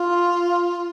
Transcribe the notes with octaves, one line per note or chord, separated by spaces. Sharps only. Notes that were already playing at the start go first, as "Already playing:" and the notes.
Already playing: F4